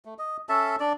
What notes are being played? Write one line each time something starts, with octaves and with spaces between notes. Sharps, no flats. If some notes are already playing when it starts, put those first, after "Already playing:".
A3
D#5
C#4 A4 E5 A5
D4 D5